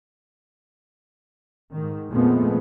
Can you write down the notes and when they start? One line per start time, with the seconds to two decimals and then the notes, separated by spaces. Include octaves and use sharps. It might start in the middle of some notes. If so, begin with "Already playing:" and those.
1.72 G#2 D#3
2.10 F2 A#2 F3 G#3 A3 B3